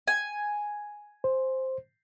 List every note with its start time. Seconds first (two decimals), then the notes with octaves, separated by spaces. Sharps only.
0.08 G#5
1.24 C5